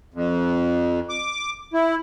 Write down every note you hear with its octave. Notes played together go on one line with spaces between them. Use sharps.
F2
D6
E4